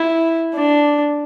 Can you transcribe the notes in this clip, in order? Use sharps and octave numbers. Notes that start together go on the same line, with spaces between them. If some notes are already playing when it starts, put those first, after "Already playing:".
Already playing: E4
D4